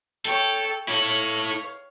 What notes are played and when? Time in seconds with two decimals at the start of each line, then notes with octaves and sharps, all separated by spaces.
0.25 A4 C#5 G5
0.88 E4 A4 C#5 F5